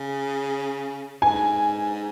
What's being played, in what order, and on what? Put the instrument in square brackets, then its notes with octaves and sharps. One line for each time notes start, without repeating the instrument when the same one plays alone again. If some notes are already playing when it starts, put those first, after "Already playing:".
Already playing: [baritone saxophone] C#3
[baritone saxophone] G#2 [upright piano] G#5